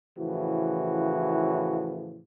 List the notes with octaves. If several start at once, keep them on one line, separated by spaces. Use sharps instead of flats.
A2 C#3 E3 F3 F#4